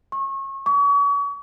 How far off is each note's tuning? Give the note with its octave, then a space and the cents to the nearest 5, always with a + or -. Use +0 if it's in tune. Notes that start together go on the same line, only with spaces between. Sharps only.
C#6 -30
C#6 +40